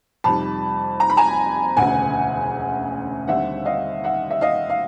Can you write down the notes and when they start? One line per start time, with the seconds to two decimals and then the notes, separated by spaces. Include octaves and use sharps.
0.24 F2 C3 D#3 G3 A5 B5
1.00 A#5
1.10 B5
1.17 G#5 A#5
1.77 E1 D2 C#3 F#5 G#5
3.28 D#2 D3 G3 C4 E5 F#5
3.65 D#5 F5
4.04 E5 F#5
4.30 E5
4.41 D#5 F5
4.70 F5